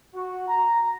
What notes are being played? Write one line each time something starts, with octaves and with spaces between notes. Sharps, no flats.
F#4
A#5